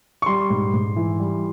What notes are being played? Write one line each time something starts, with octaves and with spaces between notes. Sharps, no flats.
C#6
G3 C6
G#2
G#2
E3
G3